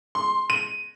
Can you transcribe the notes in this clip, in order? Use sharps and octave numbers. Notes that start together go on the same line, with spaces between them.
C6
D#7